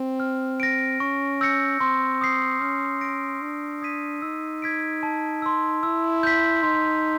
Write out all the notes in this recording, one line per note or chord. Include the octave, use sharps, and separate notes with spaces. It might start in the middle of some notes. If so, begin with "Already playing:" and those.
Already playing: C4
F6
A#6 D7
C#4 C#6
E6 G6 A#6 C#7
C4 C6
D#6 G6 C7
C#4 F6
A#6 D7
D4 C6
D#6 G#6 B6 D#7
D#4 E6
G#6 B6 D7
A5
C6 E6
E4 E6
G6 B6
D#4 C6